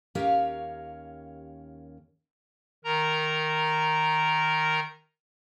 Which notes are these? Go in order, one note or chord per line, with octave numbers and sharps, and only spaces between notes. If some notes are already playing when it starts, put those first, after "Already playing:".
D#2 C#4 G4 A#4 C#5 F5
D#3 A#4 A#5